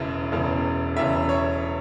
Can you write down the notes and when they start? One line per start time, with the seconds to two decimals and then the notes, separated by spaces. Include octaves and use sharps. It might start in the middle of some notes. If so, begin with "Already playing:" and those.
Already playing: E1 E2 C#3 E5
0.32 E1 E2 C#3
0.97 E1 E2 C#3 E5
1.29 C#5